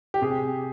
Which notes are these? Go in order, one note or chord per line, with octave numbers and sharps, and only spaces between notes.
G4
C3 G#4